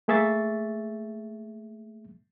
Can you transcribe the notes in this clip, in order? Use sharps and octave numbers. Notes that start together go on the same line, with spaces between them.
A3 A#3 G#4 E5 C#6 A6